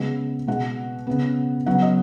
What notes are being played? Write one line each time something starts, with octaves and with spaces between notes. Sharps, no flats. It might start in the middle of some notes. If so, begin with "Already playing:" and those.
Already playing: C#3 G#3 B3
B2 G#3 B3 F#5
C#3 B3
C#3 F#3 B3 F#5
D#5